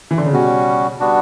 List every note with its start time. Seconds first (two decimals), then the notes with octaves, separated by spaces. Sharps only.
0.11 E3
0.18 D3
0.26 C#3
0.33 B2 G3 C#4 F#4
1.00 G3 B3 D4 F#4